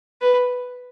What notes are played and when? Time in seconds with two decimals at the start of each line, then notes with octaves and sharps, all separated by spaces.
0.22 B4